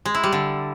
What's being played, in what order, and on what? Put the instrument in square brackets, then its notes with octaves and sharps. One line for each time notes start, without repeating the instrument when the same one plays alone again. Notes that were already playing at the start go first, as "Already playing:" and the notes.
[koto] G#3
E4
G3
D3